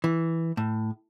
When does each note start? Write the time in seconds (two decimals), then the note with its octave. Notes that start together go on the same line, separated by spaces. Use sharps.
0.04 E3
0.57 A2